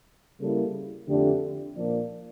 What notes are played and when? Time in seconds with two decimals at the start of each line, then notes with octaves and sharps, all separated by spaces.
0.39 C#3 G3 A#3 E4 A4
1.07 F2 D3 A3 D4 G4
1.75 A#2 F3 A#3 D4